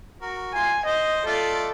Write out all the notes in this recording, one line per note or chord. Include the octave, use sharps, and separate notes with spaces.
F#4 A#4
F4 G#5 C6
C5 D#5
A3 F4 A4 D5